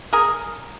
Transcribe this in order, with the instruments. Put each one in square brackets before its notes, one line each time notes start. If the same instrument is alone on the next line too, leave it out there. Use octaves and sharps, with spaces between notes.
[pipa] G#4 A#4